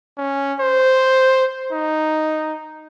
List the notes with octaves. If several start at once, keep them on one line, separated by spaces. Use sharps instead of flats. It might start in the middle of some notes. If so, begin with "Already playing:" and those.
C#4
C5
D#4